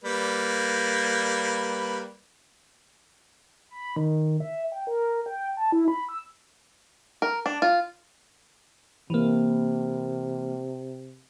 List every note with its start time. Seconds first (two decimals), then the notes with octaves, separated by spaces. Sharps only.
0.04 G3 A#3 B4
3.71 B5
3.96 D#3
4.40 E5
4.72 G5
4.87 A#4
5.26 G5
5.57 A5
5.72 E4
5.88 B5
6.09 E6
7.22 A#4
7.46 D4
7.62 F4
9.10 C3 E3 A#3